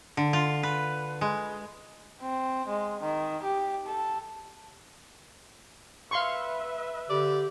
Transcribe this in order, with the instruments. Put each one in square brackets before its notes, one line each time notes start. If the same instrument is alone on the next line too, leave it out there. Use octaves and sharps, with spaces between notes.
[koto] D3
F4
B4
G#3
[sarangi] C4
G#3
D#3
G4
A4
[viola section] B4 E5 [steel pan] F5 C6 C#6
[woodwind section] D3 G4 [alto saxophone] D5